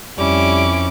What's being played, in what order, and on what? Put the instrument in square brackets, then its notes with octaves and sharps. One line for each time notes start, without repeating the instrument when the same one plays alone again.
[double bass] F2 [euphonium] G3 [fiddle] C#4 [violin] E4 D6